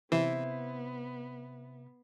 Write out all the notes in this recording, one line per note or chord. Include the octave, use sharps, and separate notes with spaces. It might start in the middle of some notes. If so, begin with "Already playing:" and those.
C3 E3 B3 E4 C5